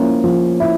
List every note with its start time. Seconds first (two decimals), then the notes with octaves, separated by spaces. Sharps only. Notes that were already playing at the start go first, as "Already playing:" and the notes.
Already playing: F3 A#3 C#4 E4
0.24 F3
0.60 E4